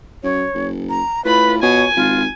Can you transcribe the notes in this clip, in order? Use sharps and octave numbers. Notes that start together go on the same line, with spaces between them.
F#2 C#5
F#1
A#5
A2 F4 B4 B5
B2 C#5 G#5
G#1 F4